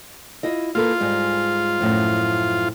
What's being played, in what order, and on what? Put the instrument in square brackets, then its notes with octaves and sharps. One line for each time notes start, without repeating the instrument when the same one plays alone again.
[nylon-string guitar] E4 F4 D#5
[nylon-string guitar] A#3 A4 B4 [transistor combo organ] F4
[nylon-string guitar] G#2 G3 G#3
F#2 A2 F3